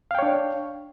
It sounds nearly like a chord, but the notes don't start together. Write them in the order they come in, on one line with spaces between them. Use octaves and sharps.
F5 G5 C#5 D4